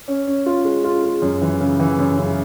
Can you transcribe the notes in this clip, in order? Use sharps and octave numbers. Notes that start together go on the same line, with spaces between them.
C#4
C#4
F4
G#3
F4
G#3
F#2
E3
C#3
E3
F#2
C#3